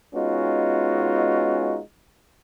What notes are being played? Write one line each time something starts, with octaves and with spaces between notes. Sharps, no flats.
G#3 B3 C#4 D#4 F4 F#4